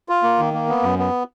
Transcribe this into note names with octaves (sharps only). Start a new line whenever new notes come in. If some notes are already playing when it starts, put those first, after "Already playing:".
F4
A#3
D#3
A#3
B3
F#2
B3